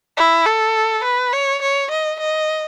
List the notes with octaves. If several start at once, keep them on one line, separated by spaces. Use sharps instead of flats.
E4
A4
B4
C#5
C#5
D#5
D#5